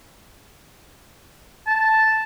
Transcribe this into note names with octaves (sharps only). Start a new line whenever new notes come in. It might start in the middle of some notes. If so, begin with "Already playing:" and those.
A5